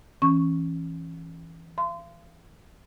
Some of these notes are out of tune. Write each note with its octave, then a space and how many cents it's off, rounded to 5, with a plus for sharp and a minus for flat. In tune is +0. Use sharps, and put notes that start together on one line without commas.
E3 +0 C#4 -20 C#6 +0
F5 -40 C6 -25